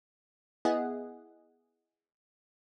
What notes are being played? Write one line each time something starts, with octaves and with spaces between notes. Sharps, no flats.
B3 E4 G#4 D#5 F#5